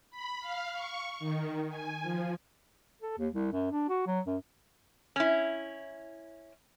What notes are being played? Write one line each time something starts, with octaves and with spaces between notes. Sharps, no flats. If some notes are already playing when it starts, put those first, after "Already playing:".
B5
F5
C#6
D#3
G#5
F3
A4
D#2
C2
F#2
D4
F#4
F#3
F#2
C#4 E4